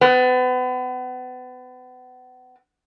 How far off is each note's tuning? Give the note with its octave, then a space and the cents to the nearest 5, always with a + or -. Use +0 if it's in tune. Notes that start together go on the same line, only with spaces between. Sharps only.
B3 +35